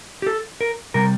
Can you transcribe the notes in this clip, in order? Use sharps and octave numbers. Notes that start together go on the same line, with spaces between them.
G4
A4
A#4
C3 G3 A#4